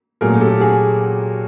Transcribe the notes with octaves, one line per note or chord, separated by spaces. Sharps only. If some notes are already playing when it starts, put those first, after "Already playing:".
A#2 F#3 A3 G#4 A#4
G4 A4
F#4 G#4